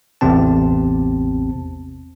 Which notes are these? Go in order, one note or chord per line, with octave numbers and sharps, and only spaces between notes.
A1 E2 C3 C4 A5